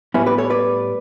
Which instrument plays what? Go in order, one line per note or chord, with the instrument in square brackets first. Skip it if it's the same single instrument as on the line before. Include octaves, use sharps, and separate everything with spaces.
[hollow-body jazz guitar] A2 G3 B3 C#4 E4
G4 B4
A4 C#5
B4 D5